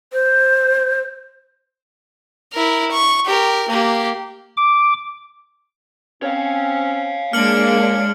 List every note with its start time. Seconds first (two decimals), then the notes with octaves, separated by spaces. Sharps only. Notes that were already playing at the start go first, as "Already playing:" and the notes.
0.13 C5
2.53 E4 A#4
2.91 C#6
3.26 G4 A#4
3.69 A#3 G4
4.57 D6
6.23 C4 C#4 C#5 F5
7.33 G#3 A#3 D4 F6 C#7 F#7